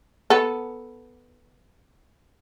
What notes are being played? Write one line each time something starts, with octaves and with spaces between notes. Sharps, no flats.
B3 A4